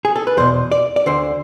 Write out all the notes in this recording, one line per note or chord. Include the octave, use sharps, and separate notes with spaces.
G#4
A4
B4
E2 B2 C5
D5
D5
D2 D3 C5